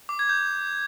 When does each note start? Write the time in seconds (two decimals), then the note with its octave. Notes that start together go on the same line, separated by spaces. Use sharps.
0.09 D6
0.19 G#6
0.29 G6